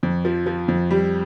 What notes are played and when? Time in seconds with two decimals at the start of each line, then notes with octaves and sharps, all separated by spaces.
0.03 F2
0.25 F3
0.46 F3
0.68 F2
0.91 G3